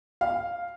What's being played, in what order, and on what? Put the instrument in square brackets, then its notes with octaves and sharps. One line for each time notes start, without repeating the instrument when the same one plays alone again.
[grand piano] F5